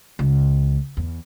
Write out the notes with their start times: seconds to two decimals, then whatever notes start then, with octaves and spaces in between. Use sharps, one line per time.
0.19 C#2
0.97 E2